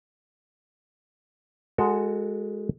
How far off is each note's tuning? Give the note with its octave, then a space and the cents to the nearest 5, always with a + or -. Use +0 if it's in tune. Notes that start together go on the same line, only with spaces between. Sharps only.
G#3 +0 F#4 +0 A4 +30